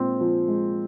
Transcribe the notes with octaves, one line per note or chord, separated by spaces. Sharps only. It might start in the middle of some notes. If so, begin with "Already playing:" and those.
Already playing: A#2 G#3 C4
F3
G#3